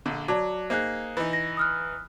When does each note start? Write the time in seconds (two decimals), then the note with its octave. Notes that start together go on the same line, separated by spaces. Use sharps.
0.06 A#1 D3
0.28 F#3 D5 A5 D6
0.70 A#3 D#4 G#4 C5 F#6
1.17 E3 D#4
1.33 A#6
1.57 D#6 F6 F#6